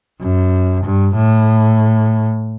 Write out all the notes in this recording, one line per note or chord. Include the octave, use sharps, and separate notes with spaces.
F#2
G2
A2